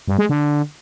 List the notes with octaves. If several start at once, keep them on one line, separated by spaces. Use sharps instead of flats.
G2
G#3
D3